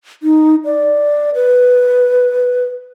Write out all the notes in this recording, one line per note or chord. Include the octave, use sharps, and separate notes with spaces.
D#4
D5
B4